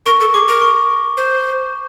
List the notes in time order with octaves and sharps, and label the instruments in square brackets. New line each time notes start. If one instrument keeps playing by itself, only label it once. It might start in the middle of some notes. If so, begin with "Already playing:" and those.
[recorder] A#4 [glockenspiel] C#6
[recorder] A4
[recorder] G#4 [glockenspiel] D6
[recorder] A#4
[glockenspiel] C#6
[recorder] C5